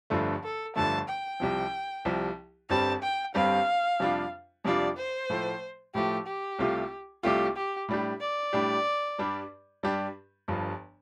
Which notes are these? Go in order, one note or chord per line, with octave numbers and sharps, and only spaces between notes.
G1 G2 D3 F3 A3
A4
G1 G2 D3 F3 A3 A5
G5
C2 C3 F3
C2 C3 F3
G1 G2 G3 C4 G4 A5
G5
G1 G2 G3 C4 G4 F5
F2 C3 G3 D4 F4
F2 C3 G3 D4 F4 D5
C5
A2 F3 A3
A2 F3 A3 G4
G4
C2 C3 A3 F4
C2 C3 A3 F4 G4
G4
A2 G3 D4 G4
D5
A2 G3 D4 G4
G2 G3 D4 G4
G2 G3 D4 G4
G1 G2 F3